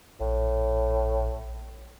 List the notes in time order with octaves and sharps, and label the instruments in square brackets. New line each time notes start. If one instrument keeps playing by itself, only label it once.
[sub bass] A#1 [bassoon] A2